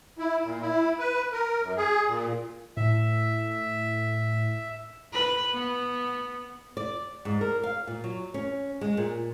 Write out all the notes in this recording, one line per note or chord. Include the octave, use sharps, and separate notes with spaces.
E4
A#2
E4
B4
A#4
F#2
G#4
A#2
A2 E5
B4
B3
D5
G#2
A#4
F5
A#2
F#3
C#4
G#3
A#2